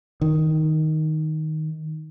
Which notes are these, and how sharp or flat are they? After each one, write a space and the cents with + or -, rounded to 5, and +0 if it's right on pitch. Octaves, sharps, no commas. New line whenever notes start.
D#3 +5